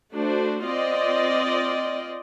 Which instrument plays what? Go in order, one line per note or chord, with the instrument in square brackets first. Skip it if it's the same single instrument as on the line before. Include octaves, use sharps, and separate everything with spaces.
[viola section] A3 D4 F#4 C5
C4 F4 D5 D#5